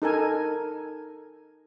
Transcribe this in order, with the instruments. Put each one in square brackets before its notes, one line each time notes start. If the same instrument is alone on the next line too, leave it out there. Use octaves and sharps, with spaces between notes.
[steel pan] D#4 A4 A#4 G#5